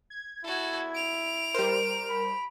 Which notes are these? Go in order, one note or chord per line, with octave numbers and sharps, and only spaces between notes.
G#6
E4 F#4 A4
D7 F7
G3 A#4 C5
B5